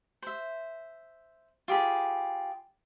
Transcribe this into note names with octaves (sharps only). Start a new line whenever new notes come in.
C5 E5
F4 G4 G#4 B5